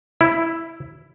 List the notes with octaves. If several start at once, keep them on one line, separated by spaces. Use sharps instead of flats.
E4